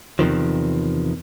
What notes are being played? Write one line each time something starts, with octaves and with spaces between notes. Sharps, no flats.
E2 C3 D#3 F3